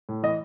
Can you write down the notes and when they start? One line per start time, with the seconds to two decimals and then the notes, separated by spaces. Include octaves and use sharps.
0.09 A2
0.23 E3 D#5